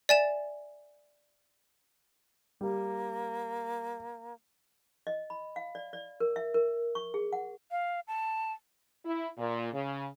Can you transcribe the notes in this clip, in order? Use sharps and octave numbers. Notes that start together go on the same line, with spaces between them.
D5 E5 G#5 A6 E7
G3 A#3
D#5
B5
F5
D5
D5
A#4
E5
A#4
C#6
G#4
F#5
F5
A5
E4
A#2
C#3